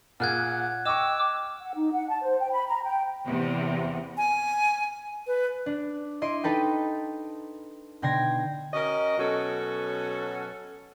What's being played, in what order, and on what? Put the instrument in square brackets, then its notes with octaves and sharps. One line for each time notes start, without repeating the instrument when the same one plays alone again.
[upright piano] A#2 G#4 [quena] F#5 [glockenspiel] F6 F#6 G#6
[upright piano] D#5 C#6 [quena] G5 [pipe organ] D6 E6 [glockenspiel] E7
[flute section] F#5
D#4
F#5
A5
C5
G5
B5
A#5
G5
[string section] E2 C3
[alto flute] G#5
B4
[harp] D4
E4 D#5 C6 D6
D#4 A4 B4 G5
B2 D3 G5 C6 G#6 A#6
[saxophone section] C#4 F#4 A#4 D#5
B2 F#3 C#4 F#4 A4